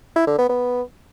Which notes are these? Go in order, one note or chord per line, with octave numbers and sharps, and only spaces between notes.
E4
D3
B3
B3